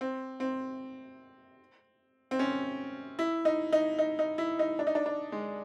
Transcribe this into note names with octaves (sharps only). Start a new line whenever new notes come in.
C4
C4
C4
C#4
E4
D#4
D#4
D#4
D#4
E4
D#4
D4
D#4
D4
D4
G#3